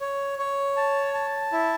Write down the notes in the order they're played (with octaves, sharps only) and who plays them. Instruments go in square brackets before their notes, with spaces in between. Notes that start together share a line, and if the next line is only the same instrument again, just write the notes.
[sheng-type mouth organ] C#5
C#5
A5
A5
E4